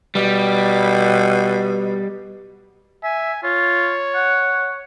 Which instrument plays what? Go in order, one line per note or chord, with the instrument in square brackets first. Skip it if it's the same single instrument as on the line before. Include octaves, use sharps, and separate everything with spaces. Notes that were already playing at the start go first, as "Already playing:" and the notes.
[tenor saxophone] B2 [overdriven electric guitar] G3
[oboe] E5 [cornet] G#5
[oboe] F4 [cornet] C#5
[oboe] F#5